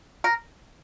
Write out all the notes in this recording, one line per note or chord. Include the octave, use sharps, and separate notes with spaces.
A#4